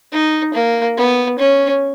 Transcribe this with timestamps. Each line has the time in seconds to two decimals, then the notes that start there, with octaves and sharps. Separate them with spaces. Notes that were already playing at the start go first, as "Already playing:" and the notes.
0.13 D#4
0.54 A#3
0.98 B3
1.39 C#4